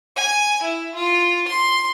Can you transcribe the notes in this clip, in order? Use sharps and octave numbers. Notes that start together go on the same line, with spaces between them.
G#5
E4
F4
C6